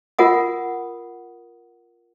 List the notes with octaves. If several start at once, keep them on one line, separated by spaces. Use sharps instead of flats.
F4 A#4 F#5 D#6